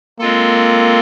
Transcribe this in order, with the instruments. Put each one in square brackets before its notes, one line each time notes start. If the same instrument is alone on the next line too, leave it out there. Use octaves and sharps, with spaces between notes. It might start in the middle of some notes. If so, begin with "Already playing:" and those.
[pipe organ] G#3 C4 F4 A4 [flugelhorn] A#3